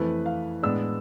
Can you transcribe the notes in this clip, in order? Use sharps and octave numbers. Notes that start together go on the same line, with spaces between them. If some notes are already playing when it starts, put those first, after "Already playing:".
Already playing: F2 E3 A3 E4 B4
F5
A2 G#3 B3 D4 E6